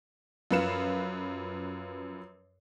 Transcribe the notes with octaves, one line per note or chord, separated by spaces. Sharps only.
F#2 F3 B4 F5 C#7 E7